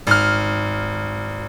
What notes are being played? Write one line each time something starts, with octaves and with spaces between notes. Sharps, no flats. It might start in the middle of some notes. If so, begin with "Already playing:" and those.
G#1 F6